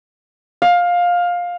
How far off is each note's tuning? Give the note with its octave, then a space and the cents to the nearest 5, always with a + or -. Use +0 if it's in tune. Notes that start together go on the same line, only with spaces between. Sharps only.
F5 +15